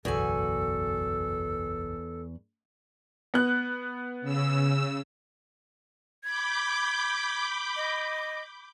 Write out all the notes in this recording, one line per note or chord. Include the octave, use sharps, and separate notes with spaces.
F#1 B1 E2 F#4 A4 G#5
B3 F#6
C#3 E6
B5 D6 G6 G#6
D#5